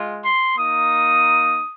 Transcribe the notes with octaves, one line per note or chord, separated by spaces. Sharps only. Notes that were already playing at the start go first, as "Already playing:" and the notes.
Already playing: G#3 F4
C6
A#3 D#4 D#6